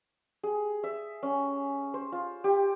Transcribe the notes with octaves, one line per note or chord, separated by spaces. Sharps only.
G#4
E5
C#4
C5
F4
G4